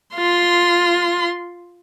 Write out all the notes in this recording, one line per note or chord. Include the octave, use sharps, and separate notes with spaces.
F4 C6